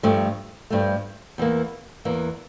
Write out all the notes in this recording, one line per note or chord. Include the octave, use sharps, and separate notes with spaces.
G2 F3 A3
G2 F3 A3
E2 E3 A#3
E2 E3 A#3